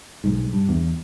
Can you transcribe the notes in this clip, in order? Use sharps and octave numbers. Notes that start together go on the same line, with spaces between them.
B1 G#2
G2
E2